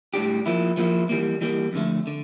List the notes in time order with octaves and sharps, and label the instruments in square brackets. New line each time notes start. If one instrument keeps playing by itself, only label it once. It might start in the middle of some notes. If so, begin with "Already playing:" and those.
[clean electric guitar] A2 G3 D4 G4
F3 A#3 E4
F3 A#3 E4
E3 G3 A#3
E3 G3 A#3
F2 D3 A3
D3